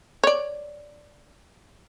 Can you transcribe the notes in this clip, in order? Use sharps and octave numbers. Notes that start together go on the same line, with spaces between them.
C#5 D5